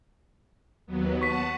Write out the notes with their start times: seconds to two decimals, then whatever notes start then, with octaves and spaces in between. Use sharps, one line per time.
0.87 D#2 F#3 B3
1.22 F#5 A5 C#6 B6